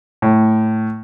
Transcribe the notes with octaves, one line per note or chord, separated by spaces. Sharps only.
A2